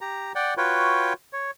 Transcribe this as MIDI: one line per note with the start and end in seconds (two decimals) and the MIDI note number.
0.01 0.32 67
0.01 0.32 82
0.35 0.54 74
0.35 0.54 78
0.35 0.54 79
0.57 1.13 65
0.57 1.13 66
0.57 1.13 71
0.57 1.13 73
0.57 1.13 79
1.33 1.51 73